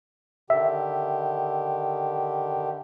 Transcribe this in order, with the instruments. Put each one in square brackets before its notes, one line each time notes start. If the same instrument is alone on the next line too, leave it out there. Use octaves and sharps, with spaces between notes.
[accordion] D3 D#3 G4 [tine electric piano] E5